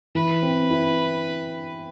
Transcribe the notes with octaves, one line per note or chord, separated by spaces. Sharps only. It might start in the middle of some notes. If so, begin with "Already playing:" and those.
E3 B4
C4
E4